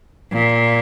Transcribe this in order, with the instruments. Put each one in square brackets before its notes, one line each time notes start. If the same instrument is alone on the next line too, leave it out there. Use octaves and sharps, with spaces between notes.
[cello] A#2